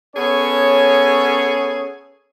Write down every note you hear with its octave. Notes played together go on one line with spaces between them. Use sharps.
B3 C#4 G#4 A4 C#5